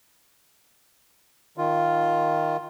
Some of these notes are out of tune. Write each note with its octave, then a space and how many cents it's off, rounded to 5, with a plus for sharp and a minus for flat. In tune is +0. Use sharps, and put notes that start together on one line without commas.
D#3 +0 F4 +0